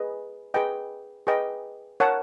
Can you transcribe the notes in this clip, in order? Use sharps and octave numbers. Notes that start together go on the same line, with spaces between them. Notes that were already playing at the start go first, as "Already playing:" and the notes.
Already playing: G#4 B4 D#5
G#4 B4 D#5 G5
G#4 B4 D#5 G5
A#4 C#5 F#5 A5